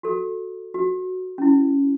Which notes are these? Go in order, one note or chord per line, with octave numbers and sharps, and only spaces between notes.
F#4 A4
F#4
C#4 E4